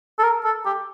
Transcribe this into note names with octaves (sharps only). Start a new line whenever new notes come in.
A4
A#4
A4
G4